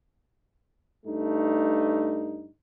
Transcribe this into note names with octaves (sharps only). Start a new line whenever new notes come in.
G2 A3 D#4